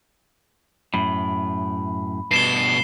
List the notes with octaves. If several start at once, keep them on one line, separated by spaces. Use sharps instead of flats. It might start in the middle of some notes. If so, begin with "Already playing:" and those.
F#2 A2 B5
G2 B2 C7 E7 G7